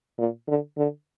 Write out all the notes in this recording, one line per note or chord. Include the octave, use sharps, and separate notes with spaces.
A#2
D3
D3